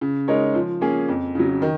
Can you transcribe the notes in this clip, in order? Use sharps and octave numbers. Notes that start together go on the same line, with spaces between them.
C#3
G#3 D#4 A#4 C#5
F3
A#3 C#4 G#4
F2
C#3 F#3
D#3